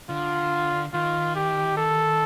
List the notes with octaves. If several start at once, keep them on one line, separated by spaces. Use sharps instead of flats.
D3 F4
D#3 F4
G4
A4